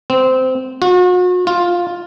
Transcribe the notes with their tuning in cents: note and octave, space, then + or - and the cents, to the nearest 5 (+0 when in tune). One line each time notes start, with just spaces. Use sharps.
C4 -15
F#4 -40
F4 +5